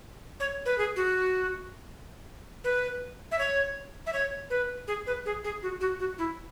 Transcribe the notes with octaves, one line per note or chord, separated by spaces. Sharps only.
C#5
B4
G#4
F#4
B4
E5
C#5
E5
C#5
B4
G#4
B4
G#4
G#4
F#4
F#4
F#4
E4